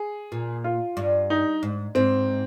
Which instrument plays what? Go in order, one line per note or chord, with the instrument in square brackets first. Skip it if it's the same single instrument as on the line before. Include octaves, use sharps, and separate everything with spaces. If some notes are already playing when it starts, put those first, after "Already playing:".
Already playing: [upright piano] G#4
[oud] A#2
[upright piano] F4
[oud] G2
[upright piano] D#4
[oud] G#2
[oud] G#2 [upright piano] C4